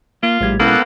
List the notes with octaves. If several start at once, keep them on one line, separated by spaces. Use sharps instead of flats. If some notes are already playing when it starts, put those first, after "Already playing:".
A#3 F4
A#1 A2 G3 G#6
B1 G#3 A#3 B3 C#4 E4 A4 F#5